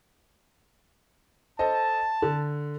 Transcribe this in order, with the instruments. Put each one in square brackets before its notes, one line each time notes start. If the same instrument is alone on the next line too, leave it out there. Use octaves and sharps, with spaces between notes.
[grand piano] A4 C5 D#5 [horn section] A5
[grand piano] D3